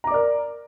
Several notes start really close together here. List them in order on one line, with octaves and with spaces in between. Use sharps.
A#5 D6 D5 A#4